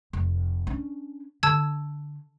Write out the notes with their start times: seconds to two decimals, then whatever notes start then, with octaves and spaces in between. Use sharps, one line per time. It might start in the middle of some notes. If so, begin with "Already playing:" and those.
0.13 F1
0.67 C#4 D4
1.43 D3 A5 E6 G#6